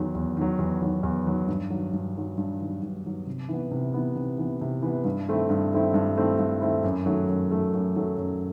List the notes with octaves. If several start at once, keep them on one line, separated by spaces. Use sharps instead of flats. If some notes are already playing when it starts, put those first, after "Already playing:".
Already playing: E2 D#3 F#3
E2
D#3 F#3
E2
D#3 F#3
E2
D#3 F#3
G2
D#3 F#3
G2
D#3 F#3
G2
D#3 F#3
G2
D#3 F#3
C3
E3 B3
C3
E3 B3
C3
E3 B3
C3
E3 B3
G2
D#3 A3 C4 E4
G2
D#3 A3 C4 E4
G2
D#3 A3 C4 E4
G2
D#3 A3 C4 E4
F#2
D#3 F#3 A3
F#2
D#3 F#3 A3
F#2
D#3 F#3 A3
F#2